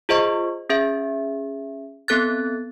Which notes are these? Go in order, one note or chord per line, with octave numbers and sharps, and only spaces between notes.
F4 G#4 C5 D#5 C#6
C#4 G#4 E5
B3 C4 A4 F#6 A6